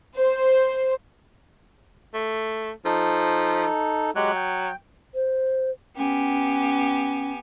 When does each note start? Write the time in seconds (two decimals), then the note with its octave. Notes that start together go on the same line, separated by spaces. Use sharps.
0.17 C5
2.14 A3
2.85 F3 D#4 A4
4.16 F#3 G#3 G4 F#6
4.36 G5
5.14 C5
5.97 B3 C#4 G4 G#5